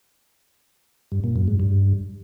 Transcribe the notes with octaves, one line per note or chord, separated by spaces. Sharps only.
G2
A#2
F#2
G#2
G2